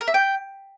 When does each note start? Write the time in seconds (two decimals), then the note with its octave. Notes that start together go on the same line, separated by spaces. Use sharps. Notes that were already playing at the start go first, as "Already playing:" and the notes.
0.01 A#4
0.07 E5
0.14 G5